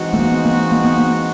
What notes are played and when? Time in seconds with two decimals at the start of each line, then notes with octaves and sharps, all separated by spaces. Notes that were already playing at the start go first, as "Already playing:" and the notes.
Already playing: E3 G#3 C4 D#4 F#4
0.14 A3
0.19 A#3
0.32 B3
0.45 A#3
0.72 A#3
0.85 B3
0.98 A#3